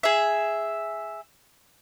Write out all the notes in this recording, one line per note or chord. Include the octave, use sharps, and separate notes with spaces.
G#4 E5